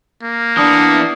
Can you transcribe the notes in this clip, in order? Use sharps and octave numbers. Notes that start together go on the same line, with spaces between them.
A#3
E3 B3 D4 D#6